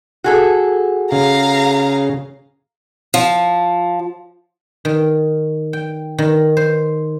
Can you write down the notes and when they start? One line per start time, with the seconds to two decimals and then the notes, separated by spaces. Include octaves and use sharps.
0.24 F#4 G#4 A4
1.12 C#3 F5 A#5
3.14 F3
4.85 D#3
5.73 G5
6.18 D#3
6.57 C5